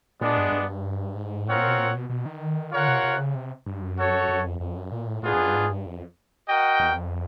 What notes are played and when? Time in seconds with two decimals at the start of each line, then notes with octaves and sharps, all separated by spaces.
0.21 A#2 G#3 B3 D4
0.37 G2
0.52 G2
1.15 G#2
1.46 A2 C4 F4 A#4 C#5 F#5
1.57 A#2
1.68 B2
1.78 A#2
1.94 B2
2.10 B2
2.26 D#3
2.72 D3 F4 A#4 C#5 F#5
2.88 C3
3.04 C3
3.19 C#3
3.35 C3
3.66 G2
3.82 F#2
3.98 F#4 A4 C#5
4.29 F#2
4.45 F2
4.60 F2
4.76 F#2
4.92 A#2
5.07 A2
5.23 A2 B3 D4 F4 G#4
5.33 F2
5.38 F#2
5.48 G2
5.55 G#2
5.70 G2
5.86 F2
6.48 F#4 A#4 D#5 G5
6.80 E2
6.95 F2